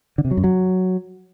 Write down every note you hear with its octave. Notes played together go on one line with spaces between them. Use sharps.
D3
C3
F#3
F#2
F#3